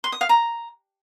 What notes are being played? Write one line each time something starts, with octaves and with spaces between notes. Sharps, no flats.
C6
D#6
F5
A#5